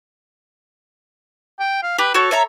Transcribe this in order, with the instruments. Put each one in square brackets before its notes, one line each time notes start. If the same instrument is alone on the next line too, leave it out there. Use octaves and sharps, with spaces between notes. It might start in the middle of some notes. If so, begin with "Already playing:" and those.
[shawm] G5
F5
[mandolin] G4 [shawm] B4
[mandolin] F#4 C#5 [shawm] A4
[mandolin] C#5 E5 A#5